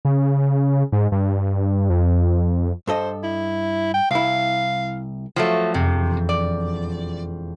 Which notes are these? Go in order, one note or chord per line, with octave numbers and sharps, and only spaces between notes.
C#3
G#2
G2
F2
G2 A4 C5 D#5
E4
G5
C2 E4 F5
F3 F#3 A3 F5
E1 F2 C3
D5